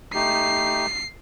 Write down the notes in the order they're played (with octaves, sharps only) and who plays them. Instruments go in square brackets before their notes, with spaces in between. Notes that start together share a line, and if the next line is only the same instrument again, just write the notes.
[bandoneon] A3 D#4 G4 [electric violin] C7